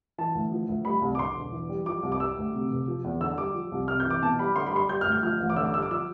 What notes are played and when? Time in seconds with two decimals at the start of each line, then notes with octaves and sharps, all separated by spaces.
0.18 E3 A5
0.35 D2
0.52 F3
0.69 D2
0.85 G3 B5
1.02 C2
1.15 D6
1.19 D3 C6
1.36 E1
1.52 E3
1.69 G3
1.86 F3 D6
2.03 C2
2.12 D6
2.20 G3 E6
2.37 D2
2.54 C3
2.71 F1
2.88 F3
3.04 E2
3.21 D3 E6
3.38 G3 D6
3.55 F3
3.72 C2
3.88 C3 F6
4.00 G6
4.05 E3
4.10 D6
4.22 B2 A5
4.39 G3 B5
4.56 D3 C6
4.66 B5
4.72 G3 C6
4.89 G3 G6
5.01 F6
5.06 D2
5.12 G6
5.23 F3 F6
5.41 A1
5.50 D6
5.56 D3 E6
5.65 D6
5.74 G3 E6
5.82 D6
5.91 F3 E6